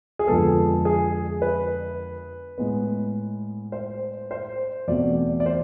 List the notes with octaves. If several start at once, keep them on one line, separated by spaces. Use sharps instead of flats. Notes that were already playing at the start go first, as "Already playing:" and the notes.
G#4
F2 D3 F3 G#3 B3 A4
G#4
B4
A2 G#3 B3
C5
C5
E2 B2 A3 C4 D5
D5
C5